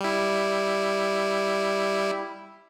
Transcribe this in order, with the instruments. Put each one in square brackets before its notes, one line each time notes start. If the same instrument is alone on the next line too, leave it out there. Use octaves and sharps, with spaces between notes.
[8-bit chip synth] G3 E4